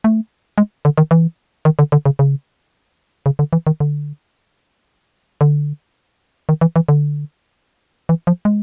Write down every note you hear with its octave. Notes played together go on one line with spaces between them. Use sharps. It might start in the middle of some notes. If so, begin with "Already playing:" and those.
A3
G#3
D3
D#3
E3
D#3
D3
D3
C#3
C#3
C#3
D3
E3
D#3
D3
D3
D#3
E3
E3
D3
E3
F3
G#3